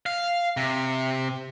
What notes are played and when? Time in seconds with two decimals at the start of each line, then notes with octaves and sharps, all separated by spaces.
0.06 F5
0.57 C3